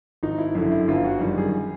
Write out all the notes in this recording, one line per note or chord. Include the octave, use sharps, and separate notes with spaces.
G#1 D#4
E4
F#2 D3 E4
E4
G1 F4
F#4
F#2 D#3 G3
G#4